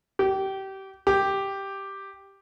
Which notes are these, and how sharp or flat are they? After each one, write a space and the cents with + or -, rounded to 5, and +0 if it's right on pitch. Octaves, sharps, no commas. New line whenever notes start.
G4 -25
G4 +0